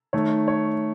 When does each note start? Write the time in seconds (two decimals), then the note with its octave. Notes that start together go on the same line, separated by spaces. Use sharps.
0.13 D#3 A3 C#5
0.48 C#5